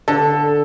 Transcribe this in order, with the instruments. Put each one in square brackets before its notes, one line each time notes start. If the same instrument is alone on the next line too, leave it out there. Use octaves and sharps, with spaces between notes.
[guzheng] D3 [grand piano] A4